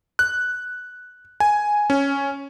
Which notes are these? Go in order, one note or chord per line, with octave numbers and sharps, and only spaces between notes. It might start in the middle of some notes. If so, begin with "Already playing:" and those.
F#6
G#5
C#4